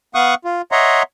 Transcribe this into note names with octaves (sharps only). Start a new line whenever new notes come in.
B3 F5 F#5 C#6 D#6 F#6
F4
C#5 D#5 E5 F#5 A#5 C6